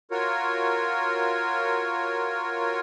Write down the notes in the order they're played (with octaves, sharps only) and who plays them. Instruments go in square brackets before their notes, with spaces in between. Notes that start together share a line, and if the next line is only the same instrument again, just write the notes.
[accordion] F4 F#4 A#4 C#5